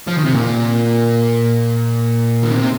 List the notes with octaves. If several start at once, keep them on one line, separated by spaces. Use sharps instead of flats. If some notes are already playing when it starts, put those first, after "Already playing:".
F3
D#3
C3
A#2
D#3
C3